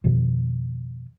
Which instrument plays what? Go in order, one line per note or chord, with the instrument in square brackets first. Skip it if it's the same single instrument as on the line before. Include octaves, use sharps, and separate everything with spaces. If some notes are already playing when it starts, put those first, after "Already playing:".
[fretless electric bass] F2 B2 D#3 F3